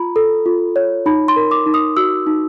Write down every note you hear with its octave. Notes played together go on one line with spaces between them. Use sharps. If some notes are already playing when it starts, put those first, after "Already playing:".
Already playing: F4 A#5 B5
A4
F4
C#5
D#4 B5
C6
A#4
D6
D#4
D#6
F#4 E6
D#4